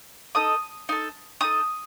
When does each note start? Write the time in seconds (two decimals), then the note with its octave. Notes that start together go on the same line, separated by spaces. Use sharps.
0.35 D#4 A4 D#6
0.89 D#4 A4
1.41 D#4 A4 D#6